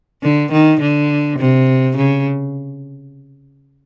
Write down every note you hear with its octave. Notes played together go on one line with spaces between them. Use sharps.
D3
D#3
D3
C3
C#3